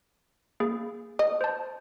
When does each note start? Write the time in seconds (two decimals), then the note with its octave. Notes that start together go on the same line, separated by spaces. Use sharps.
0.60 A#3 G#4
1.19 D#5
1.41 C5 A5